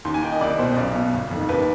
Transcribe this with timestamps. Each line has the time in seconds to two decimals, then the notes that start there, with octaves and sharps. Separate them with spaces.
0.05 D#2 C6
0.14 G#5
0.23 D#3 G5
0.32 D#5
0.41 C2 D5
0.59 B2 C5
0.73 D#5
0.77 B1 D5
0.95 B2
1.13 G1
1.31 F2 D#3
1.49 D#2 B4